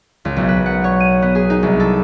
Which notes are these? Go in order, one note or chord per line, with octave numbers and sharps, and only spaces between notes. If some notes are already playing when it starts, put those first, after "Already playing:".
C#2
B1
B4
F#5
C#5
D#7
B3
G#4
D#4
C2
A4